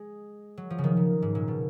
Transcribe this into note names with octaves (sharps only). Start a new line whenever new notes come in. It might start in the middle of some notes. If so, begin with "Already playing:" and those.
Already playing: G#3
F#3
F3
C#3
D#3
C#3
G#2
A#2
B2